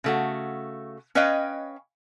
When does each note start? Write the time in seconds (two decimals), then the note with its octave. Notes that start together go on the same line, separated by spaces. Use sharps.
0.04 C#3 A3 F#4
1.15 C#4 B4 C#5 D#5 F5 G5